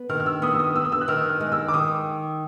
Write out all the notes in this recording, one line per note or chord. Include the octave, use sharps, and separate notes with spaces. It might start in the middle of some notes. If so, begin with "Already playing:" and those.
Already playing: B3
D#3 F6
F6
E6
B3 D#6
E6
D#6
B3 E6
D#6
E6
F#6
D#3 F6
F6
G#3
E6
D6
D#3 D#6